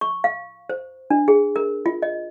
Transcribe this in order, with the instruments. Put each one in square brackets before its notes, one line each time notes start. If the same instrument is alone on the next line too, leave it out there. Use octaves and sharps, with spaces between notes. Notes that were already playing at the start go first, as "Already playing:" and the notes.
[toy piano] C#6
F5
C5
D4
G#4
A#4
F4
D#5